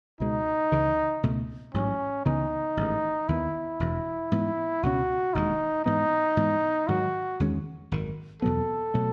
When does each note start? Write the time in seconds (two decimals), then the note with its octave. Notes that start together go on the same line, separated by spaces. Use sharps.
0.20 C#2 B2 G#3 D#4
0.72 C#2 C#3 E3
1.23 C#2 B2 A3
1.74 A1 G#2 F#3 C#4
2.26 C#2 C#3 E3 B3 D#4
2.77 A1 G#2 D#3
3.28 D#2 D#3 G#3 B3 E4
3.80 E1 E2 B2
4.32 G#2 E3 B3
4.83 C#2 B2 G#3 C#4 F#4
5.34 E1 D#2 C#3 G#3 D#4
5.85 G#2 E3 B3 D#4
6.37 G#2 E3 B3
6.88 G#2 D#3 F#3 F#4
7.40 E2 D#3 G#3 C#4
7.92 G#1 F#2 D#3
8.42 E2 B2 F#3 B3 A4
8.94 B2 F#3 A3